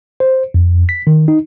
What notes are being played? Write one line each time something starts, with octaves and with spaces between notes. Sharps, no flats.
C5
F2
B6
D#3
D#4